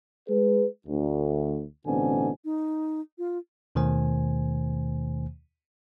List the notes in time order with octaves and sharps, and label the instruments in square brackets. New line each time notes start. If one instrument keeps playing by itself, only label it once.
[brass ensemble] G#3 G#4 B4
D2
A1 B2 D3 C4 G#5
[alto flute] D#4
F4
[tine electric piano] D#2 B2 D#3 A3 C5 G#5